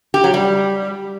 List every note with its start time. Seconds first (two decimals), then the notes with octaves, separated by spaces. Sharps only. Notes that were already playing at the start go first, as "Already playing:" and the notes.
0.14 G4
0.24 F#3
0.34 G3